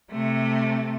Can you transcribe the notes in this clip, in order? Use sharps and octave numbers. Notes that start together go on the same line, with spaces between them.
C3 A3